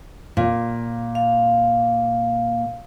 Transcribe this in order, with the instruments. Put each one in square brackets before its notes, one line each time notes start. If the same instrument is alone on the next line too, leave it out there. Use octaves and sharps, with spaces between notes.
[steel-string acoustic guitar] A#2
[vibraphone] F5